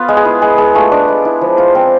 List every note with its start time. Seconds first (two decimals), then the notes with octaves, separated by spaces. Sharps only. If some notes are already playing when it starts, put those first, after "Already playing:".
Already playing: B3 F4 B4
0.08 G#3
0.17 G#4
0.25 E4
0.42 G#3 G#4
0.58 G#3 G#4
0.75 A3 F4 A4
0.91 G#3 D4 D5
1.08 G#3
1.25 E4
1.41 F3
1.58 F4
1.75 C4